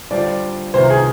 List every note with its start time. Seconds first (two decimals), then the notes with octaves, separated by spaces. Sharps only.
0.11 D3 G3 D4 F4 C5 D5
0.74 C2 C3 D#3 B3 F4 C5
0.90 G#4